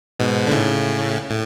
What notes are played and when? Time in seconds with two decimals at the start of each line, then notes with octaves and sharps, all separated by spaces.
0.19 G#2 B2
0.47 D3
0.52 A2 C#3
1.30 A2